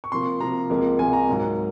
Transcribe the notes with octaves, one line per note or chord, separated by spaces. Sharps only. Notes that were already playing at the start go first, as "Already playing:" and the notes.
C#6
C3 F3 A#3 C6
C3 F3 A#3 A#5
C#2 C3 F3 A#3
C#2 C3 F3 A#3 G#5
A#5
G#2 F#3 A#3